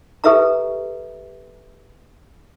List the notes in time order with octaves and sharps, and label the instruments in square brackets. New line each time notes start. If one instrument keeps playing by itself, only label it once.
[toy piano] G4 A4 B4 E5 F5 A#5